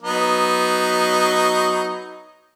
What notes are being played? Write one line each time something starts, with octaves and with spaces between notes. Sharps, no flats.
F#3 B3 D#4